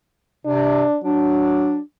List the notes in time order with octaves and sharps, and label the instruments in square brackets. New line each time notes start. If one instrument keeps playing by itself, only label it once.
[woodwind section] C3 [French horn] D4
[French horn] F#3 [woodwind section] D4